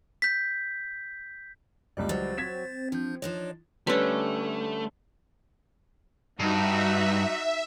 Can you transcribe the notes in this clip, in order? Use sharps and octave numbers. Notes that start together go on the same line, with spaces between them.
G6 B6
C#2 F#2 G3 A#3 D5
F#3 C5 A6
C4 G#6 B6 E7
F3 D4 G6
F3 D4 D#4 C#5
D3 G3 A3 C#4 B4
G2 D#4 F#4 E5